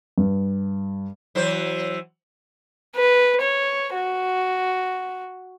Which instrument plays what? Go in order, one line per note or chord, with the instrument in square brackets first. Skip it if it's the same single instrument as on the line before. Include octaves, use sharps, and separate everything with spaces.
[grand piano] G2
[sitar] E3 F#3 C5
[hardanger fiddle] B4
C#5
F#4